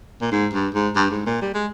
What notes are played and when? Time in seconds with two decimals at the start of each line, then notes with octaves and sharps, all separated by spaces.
0.21 A#2
0.32 G#2
0.53 G2
0.74 G#2
0.95 G2
1.11 G#2
1.26 A#2
1.42 G3
1.54 G#3